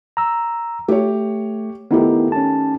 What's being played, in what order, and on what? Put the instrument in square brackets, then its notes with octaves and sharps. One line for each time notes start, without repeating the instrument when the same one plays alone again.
[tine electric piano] A#5 E6
[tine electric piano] A3 [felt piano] G4 C#5
[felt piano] D#3 A3 G4 [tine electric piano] B3 D#4 E4
[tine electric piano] C#4 A5